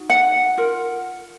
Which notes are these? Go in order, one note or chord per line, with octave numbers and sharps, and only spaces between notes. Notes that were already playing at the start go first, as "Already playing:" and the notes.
Already playing: D#4 F#4
F#5
F4 A#4